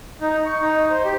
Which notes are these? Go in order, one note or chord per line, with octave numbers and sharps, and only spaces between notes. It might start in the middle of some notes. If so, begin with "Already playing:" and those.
D#4
C#6
D#4
C5
G4